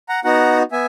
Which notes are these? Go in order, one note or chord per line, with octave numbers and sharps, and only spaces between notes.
F#5 A#5
B3 D#4 F#4 F#5 A#5
B3 E5 G#5